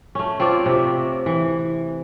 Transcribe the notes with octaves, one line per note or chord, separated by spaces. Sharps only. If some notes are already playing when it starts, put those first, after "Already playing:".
A3 C#4
C4 F4 C#5 D5
C3 E5
E3